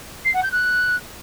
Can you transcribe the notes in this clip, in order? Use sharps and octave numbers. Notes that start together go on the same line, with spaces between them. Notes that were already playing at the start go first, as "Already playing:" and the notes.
C7
F#5
G6
F#6